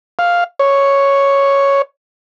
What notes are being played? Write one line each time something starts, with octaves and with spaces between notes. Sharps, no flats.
F5
C#5